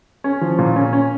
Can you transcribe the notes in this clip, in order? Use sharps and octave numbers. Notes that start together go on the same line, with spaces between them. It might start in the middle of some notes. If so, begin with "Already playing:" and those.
C#4
F3
A#2
C#4
C#4